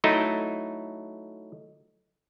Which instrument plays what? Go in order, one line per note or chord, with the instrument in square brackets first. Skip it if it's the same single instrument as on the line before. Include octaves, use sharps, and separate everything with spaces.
[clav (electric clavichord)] F#3 A3 D#4 E4